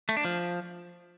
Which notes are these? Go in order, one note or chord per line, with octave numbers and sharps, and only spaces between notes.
A3
D4
F3